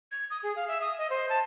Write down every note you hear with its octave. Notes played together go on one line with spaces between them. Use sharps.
G#6
D#6
G#4
F5
E5
D#6
D#5
C5
A5